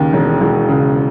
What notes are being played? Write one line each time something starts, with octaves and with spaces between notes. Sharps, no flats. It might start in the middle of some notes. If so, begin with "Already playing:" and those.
Already playing: D#2 C#3
E1
E1
C#3